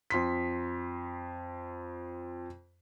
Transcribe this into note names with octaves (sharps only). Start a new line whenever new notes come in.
F2 C6 B6